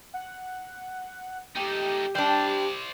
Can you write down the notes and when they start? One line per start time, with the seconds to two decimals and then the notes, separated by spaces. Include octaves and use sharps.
0.14 F#5
1.56 A3 D#4 G4
2.15 G3 D4 C5 D5